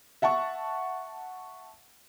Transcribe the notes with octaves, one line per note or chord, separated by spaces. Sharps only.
E5 F#5 A5 C#6